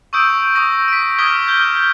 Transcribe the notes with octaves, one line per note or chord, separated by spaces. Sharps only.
C#6 D#6 E6 G6 D7
C#6 D#6 A#6
B6 D7
D6 D#6 F6 G#6 B6 G7
F6 G6 G7